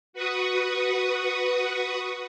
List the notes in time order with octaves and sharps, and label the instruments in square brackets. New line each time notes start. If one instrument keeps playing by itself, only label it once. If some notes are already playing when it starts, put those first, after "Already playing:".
[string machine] F#4 B4 C#6 D#6